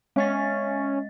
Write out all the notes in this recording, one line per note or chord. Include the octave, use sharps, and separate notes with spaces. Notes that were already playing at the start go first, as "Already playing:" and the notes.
G#3 C#4 D#5 A6